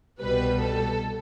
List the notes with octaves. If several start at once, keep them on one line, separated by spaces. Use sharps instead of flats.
C2 B2 G3 B4
A4